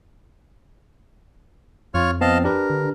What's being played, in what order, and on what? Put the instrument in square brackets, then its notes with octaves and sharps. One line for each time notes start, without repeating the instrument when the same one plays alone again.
[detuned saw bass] F2 [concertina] F4 C#5 F6
[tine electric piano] B3 C4 [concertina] D#5 F5 A5
[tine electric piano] D4 G4 B4 [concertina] A#4
[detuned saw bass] D3